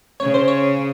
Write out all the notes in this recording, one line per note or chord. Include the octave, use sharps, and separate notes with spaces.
C#3 C#5
C5
C#5